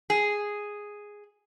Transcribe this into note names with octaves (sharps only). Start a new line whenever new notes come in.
G#4